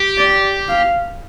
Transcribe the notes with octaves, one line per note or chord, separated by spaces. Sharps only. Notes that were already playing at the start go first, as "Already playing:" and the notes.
Already playing: G4
D5
F5